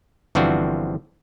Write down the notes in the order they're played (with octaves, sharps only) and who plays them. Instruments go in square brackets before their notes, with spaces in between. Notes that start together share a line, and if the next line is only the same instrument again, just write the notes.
[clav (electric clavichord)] G1 E3 F3 C4 D4 F#4